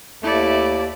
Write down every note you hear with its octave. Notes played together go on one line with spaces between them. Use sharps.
D#2 A3 E4 D5